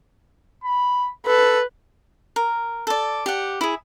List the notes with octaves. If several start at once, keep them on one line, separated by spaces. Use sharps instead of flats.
B5
A4 B4
A#4
A4 D5
G4 F#5
E4 G#4